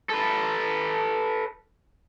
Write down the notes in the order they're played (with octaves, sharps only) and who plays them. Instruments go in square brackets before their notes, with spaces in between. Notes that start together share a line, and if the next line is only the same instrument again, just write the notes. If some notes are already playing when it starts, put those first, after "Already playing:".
[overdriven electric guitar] A4 B4